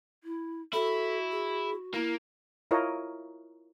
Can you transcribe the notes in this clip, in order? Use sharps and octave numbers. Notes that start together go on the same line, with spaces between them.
E4
E4 F#4 A4
G#4
A#3 E4
E4 F4 A#4 C#5 D#5